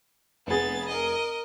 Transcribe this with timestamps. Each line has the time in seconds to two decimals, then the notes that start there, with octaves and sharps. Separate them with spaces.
0.47 F1 B3 G#4 A6
0.89 A#4 D#5